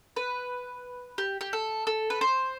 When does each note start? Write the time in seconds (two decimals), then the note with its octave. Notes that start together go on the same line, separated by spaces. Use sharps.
0.16 B4
1.18 G4
1.41 G4
1.53 A4
1.87 A4
2.10 B4
2.21 C5